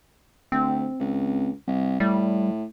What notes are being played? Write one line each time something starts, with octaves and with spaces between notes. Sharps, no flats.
D2 C4
C#2
C2
A2 G3